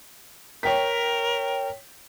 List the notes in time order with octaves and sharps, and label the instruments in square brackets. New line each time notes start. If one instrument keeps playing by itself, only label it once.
[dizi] A#4 [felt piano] C#5 G5 B6